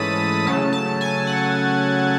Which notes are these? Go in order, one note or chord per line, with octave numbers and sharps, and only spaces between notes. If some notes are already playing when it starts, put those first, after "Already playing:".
Already playing: G#2 E3 A3 C#4 A5 B5 D#6
C#3 F#3 A3 C#4 A5
A5
G#5
F#5